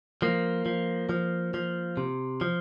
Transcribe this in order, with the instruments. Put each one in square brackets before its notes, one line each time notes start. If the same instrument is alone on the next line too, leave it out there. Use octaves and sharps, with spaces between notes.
[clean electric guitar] F3 A#3
F3
F3
F3
C3
F3